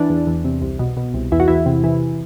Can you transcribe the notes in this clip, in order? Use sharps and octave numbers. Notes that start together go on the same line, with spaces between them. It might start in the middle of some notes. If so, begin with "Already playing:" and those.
Already playing: E3 D4
E2
E2
C3
C2
B2
B2
C2
E2 E4
F#4
E2 E4
C3
E3